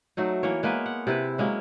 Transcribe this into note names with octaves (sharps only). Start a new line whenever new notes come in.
F#3 A3 D#4
E3 A#3 C#5
G#3 A#3 B3 B4
F#5
C3 E4 B4
F#3 G#3 A#3 C#4